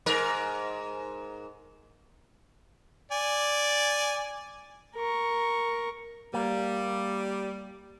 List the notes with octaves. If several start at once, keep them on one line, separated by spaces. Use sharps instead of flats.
G#2 A#4
D5 G#5
A#4 C#6
G3 A#3